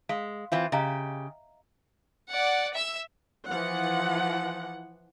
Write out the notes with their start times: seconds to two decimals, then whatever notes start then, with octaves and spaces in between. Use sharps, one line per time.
0.09 G#3 F5
0.52 E3 C4 F4 E5
0.72 C#3 G4 D#5 F5 A#5
2.31 D5 F#5
2.75 E5 E6
3.48 E3 F3 F#5